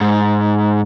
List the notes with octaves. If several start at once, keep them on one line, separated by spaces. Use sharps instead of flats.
G#2